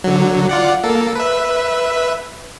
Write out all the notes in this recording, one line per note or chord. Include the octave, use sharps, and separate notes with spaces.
D3 F#3
F4 D5 F#5
A#3 A4
B4 E5